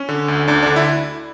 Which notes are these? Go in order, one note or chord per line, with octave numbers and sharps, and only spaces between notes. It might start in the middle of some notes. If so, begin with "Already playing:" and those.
Already playing: C#4
D3
D2
D2 D4
D3 D4
E4